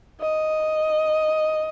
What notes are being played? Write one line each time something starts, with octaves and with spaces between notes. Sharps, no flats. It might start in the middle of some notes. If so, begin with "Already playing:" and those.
D#5